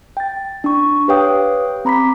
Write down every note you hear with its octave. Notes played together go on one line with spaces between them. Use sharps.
G5 A6
D4 C#6
G4 B4 C#5 F5 G5 D#6
C4 A#5 B5 D6 B6